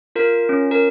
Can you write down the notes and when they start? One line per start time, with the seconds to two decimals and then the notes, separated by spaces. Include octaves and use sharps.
0.16 F4 A#4
0.49 C#4
0.71 A#4